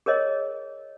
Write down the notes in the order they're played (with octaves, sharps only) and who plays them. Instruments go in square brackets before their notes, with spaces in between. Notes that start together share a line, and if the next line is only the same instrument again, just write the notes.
[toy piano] G#4 A#4 C#5 D#5